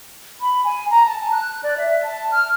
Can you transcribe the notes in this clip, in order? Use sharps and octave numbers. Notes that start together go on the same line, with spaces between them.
B5
G#5
A#5
A5
F#6
D5
E5
A5
F6